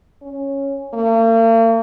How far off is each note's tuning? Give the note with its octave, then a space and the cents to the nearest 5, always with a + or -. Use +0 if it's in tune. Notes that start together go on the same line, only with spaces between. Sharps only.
C#4 -5
A#3 -45